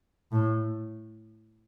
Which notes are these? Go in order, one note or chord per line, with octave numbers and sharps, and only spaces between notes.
A2